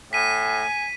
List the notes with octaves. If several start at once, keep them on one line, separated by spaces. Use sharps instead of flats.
A2 G#5 B6 D#7